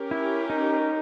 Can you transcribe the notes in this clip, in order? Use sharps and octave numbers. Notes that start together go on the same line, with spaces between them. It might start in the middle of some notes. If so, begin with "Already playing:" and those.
Already playing: C#4 G4 A#4
E4
D#4